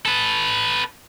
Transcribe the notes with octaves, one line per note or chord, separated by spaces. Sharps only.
A4 B4